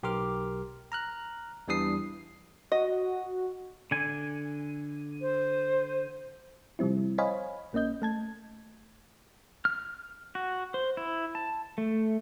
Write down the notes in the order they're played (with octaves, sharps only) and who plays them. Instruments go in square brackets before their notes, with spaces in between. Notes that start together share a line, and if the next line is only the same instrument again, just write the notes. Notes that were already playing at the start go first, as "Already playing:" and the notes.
[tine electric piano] B1 G4 A#4 C6 D6 F6
A#5 F6 F#6
E2 E3 G3 D4 D#6 C7
[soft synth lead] F#4 [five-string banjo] D#5
[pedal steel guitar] D3 G#5
[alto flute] C5
[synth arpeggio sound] C3 F3 G3 C4 E4
C5 C#5 D#5 F5 G#5 B5
A#1 A#3 C#4 D#5 G6
A3 A5 G#6
[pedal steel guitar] F6
F#4
C5
E4
A5
A3